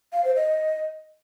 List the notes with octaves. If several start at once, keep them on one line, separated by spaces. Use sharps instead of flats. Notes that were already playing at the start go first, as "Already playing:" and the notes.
F5
C5
D#5